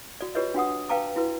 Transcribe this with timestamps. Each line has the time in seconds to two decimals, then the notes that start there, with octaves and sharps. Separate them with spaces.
0.21 F#4 D5
0.35 F4 G4 B4 C#5 D#5
0.54 D4 F#4 F#5 D#6
0.89 B4 F5 G5 A5 A#5 D6
1.16 E4 F#4 B4